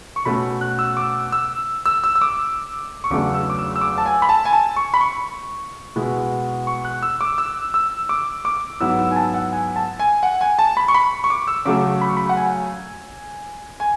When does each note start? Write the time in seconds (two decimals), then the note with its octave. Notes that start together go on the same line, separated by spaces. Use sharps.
0.16 C#6
0.25 B2 A3 C#4 B5
0.61 F#6
0.79 E6
0.97 D6
1.32 E6
1.86 E6
2.04 E6
2.15 E6
2.21 D6
3.04 C#6
3.10 E2 C#3 F#3 A3 D4 D6
3.34 E6
3.50 D6
3.59 E6
3.76 E6
3.81 D6
3.98 A5
4.06 G#5
4.22 B5
4.29 A5
4.45 G#5
4.53 A5
4.76 C#6
4.94 B5
5.01 C#6
5.96 B2 G#3 B3 E4
6.67 C#6
6.85 F#6
7.03 E6
7.21 D6
7.38 E6
7.74 E6
8.09 D6
8.45 D6
8.80 G#2 F#3 B3 E4 E6
8.99 E6
9.11 G#5
9.16 A5
9.34 F#5
9.52 G#5
9.76 A5
10.00 G#5
10.23 F#5
10.41 G#5
10.59 A5
10.77 B5
10.88 C#6
10.94 B5
11.24 C#6
11.30 D6
11.47 E6
11.65 C#3 F#3 A3 D6
12.01 B5
12.09 C#6
12.17 B5
12.29 F#5
12.37 G#5
13.80 G#5